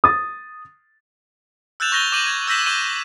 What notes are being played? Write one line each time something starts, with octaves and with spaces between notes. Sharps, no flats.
D#6 A6
E6 F#6 G6 A6 E7 F7
C#6 G6 A6 A#6 F7 G7
D6 G6 D#7 F#7
G#6
E6 G6 A#6 B6 E7
D6 G6 D#7 G7